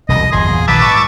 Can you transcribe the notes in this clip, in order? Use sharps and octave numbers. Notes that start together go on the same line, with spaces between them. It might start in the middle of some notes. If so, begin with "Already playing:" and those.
E1 C2 C3 D#5
G1 E2 G#2 G#4 C6
E2 A#2 F#3
A#1 D#3 F#3 B4 A5 D6 E6 B6
G#2 C#6